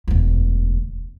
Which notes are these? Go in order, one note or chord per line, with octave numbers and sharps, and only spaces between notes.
E1 D2